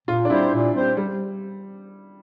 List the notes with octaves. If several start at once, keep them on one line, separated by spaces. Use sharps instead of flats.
A#2 F4
D4
G3 C4 E4 G4 C5
A#2
G3 C4 G4 C5
G3